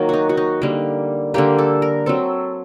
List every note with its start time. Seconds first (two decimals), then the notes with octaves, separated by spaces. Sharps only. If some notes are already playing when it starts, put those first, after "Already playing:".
Already playing: D#3 F#3 A#3
0.09 D#4 F#4
0.29 F#4
0.37 D#4
0.62 D3 G3 A#3
1.34 D3 G3 A#3 G4
1.59 A4
1.82 A#4
2.06 F#3 C4 A4